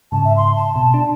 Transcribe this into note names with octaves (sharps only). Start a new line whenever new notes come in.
G#2 C#3 A5
E5
C6
A5
B2
D4